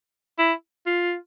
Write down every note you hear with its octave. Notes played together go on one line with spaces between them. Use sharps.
E4
F4